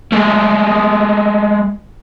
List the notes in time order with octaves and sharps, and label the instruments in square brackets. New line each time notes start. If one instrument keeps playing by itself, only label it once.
[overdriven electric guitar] G#3 A3